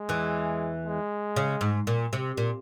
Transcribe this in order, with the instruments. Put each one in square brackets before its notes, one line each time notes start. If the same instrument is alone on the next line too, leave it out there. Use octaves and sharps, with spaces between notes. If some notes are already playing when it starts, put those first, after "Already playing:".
Already playing: [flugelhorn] G#3
[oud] E2 E3
[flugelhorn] G#3
[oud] C#3
G#2
A#2
C3
A#2